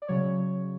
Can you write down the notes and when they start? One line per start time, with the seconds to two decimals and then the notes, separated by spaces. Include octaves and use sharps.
0.02 D5
0.08 C#3 F#3 C#5